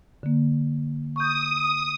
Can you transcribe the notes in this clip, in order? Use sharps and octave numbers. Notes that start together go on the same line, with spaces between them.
D3 A#3
C#6 D#6 G6